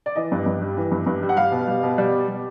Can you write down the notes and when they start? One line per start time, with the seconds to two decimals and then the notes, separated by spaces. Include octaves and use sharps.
0.06 D5
0.16 E3 D#5
0.32 G2
0.46 G2
0.61 G3
0.77 E3
0.92 G2
1.06 G2
1.22 G3
1.29 F#5
1.36 G3 F5
1.52 B2
1.68 G3
1.83 B2
1.98 G3 D5
2.13 B2
2.28 G3